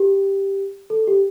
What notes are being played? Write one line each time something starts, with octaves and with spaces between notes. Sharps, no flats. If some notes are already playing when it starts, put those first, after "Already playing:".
Already playing: G4
A4
G4